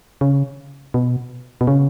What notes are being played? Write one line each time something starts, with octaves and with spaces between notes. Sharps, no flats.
C#3
B2
B2
C#3